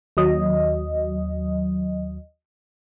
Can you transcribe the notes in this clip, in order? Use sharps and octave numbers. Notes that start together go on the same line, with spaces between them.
D#2 F#3 D#5